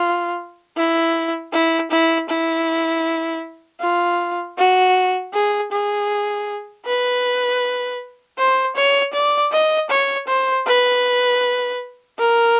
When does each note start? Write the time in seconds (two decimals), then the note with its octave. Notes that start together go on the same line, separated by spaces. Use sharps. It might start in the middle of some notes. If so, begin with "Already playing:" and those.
Already playing: F4
0.77 E4
1.53 E4
1.91 E4
2.29 E4
3.81 F4
4.58 F#4
5.33 G#4
5.72 G#4
6.85 B4
8.38 C5
8.76 C#5
9.13 D5
9.52 D#5
9.90 C#5
10.28 C5
10.67 B4
12.18 A#4